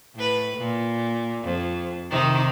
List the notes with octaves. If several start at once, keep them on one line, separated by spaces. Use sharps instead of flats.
A2 B4
A#2
F2
C3 D#3 D#4